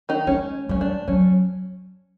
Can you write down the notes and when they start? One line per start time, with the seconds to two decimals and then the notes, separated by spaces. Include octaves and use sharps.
0.09 D#3 D#4
0.27 G#3 C#4
0.69 G3 C#4
0.81 G#3 D4
1.08 F#3 C#4